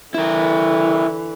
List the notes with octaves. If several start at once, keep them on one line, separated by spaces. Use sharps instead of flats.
D3 E3 E4 A#4